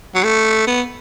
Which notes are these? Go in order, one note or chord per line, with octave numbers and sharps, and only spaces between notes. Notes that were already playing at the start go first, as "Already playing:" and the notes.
F#3
A3
B3